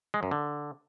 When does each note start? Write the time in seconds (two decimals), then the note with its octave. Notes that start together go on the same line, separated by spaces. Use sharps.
0.14 G#3
0.23 F#2
0.31 D3